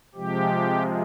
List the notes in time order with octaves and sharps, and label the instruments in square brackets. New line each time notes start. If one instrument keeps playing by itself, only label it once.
[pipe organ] C3 F3 G#3 G4